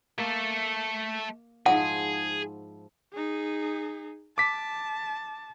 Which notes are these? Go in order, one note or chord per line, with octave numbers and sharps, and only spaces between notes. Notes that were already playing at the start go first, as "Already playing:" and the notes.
A3 A#3 A4
G#2 F3 E4 G#4 F#5
D#4 G#4
A5 D6 B6